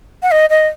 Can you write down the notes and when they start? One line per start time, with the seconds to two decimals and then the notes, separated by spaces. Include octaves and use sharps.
0.23 F#5
0.31 D#5
0.50 D#5